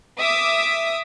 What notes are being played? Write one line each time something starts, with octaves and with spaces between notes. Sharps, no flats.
E5 D6 D#6